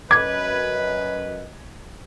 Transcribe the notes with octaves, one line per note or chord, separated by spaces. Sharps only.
F#2 B4 D#5 D6 G#6